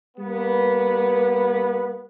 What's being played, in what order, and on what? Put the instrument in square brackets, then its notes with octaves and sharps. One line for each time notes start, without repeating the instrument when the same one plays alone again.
[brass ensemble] G3 A#3 B3